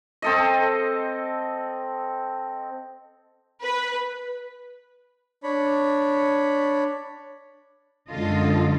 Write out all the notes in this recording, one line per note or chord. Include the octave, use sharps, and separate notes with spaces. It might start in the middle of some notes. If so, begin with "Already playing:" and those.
C4 A4 D#5
B4
D4 C#5 B5
F#2 D3 G#3 F4 A4 D#5